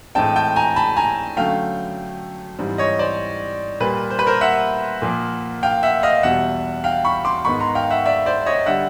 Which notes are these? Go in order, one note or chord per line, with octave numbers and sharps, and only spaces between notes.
A2 E3 G#3 C4 G5 A5
G5 A5
G#5 A#5
A5 B5
G#5 A#5
D3 F#3 A3 C#4 F5 G5
G#2 E3 G3 C4
C#5 D#5
C5 D5
A#2 G3 A#3 B4
C5
B4
A#4 C5
E5 F#5
A#2 F3 A#3
F5 G5
E5 F#5
D#5 F5
E2 B2 G3 E5 F#5
F5 G5
B5 C#6
C6 D6
G#2 D#3 G#3 B3 B5 C#6
A#5 C6
F5 G5
E5 F#5
D5 E5
C5 D5
C#5 D#5
D3 G3 E5 F#5